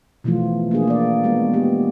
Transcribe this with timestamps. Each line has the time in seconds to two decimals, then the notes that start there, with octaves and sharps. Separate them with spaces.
0.24 B2 E3 F3 A3 F4
0.71 A#3 D4 G#4
0.87 A#3 D5
1.23 G#3 B3 F#4
1.53 B3 G4